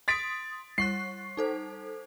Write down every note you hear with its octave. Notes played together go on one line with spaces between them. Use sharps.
C6 D#6 A6 B6 D7
G3 C#6 F#6 C7
D#4 A4 C5